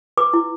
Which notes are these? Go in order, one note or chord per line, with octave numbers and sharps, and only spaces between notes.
B4 D6
E4